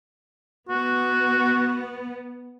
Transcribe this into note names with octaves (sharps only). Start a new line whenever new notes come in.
B3 F#4